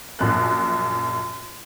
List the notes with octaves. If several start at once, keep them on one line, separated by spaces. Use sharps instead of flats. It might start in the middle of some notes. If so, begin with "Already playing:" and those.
A#1 F#2 F#6